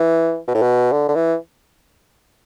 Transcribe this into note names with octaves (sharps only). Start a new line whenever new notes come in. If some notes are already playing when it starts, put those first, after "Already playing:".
Already playing: E3
B2
A2
B2
D3
D3
E3